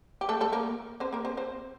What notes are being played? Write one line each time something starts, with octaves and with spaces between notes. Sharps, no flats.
G4
A3 A4
A3 A4
A#3 A#4
C4 C5
A#3 A#4
C4 C5
C4 C5